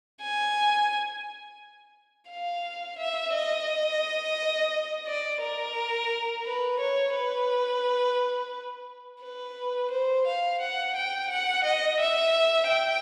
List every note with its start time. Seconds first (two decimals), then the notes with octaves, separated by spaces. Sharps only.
0.23 G#5
2.30 F5
2.99 E5
3.34 D#5
5.07 D5
5.42 A#4
6.46 B4
6.80 C#5
7.15 B4
9.23 B4
9.91 C5
10.26 F5
10.60 F#5
10.96 G5
11.30 F#5
11.64 D#5
12.00 E5
12.68 G5